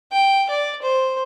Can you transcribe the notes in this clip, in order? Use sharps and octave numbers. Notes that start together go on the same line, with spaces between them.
G5
D5
C5